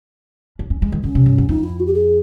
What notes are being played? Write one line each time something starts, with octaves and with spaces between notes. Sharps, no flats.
D4
C#4
G#3
D#3
D3 C#4
C3
G2
F#2
F2 D#4
E4
F#4
G4
G#4